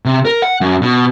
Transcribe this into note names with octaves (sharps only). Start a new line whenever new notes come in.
C3
A#4
F#5
F#2
B2